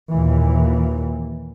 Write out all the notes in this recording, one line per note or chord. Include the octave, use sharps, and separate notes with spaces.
D#2 A#2 E3